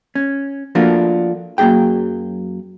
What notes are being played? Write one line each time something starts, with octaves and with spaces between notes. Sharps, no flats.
C#4
F3 A3 A#3 D4 F4 F#4
F#2 F#3 A#3 D#4 G#4 G5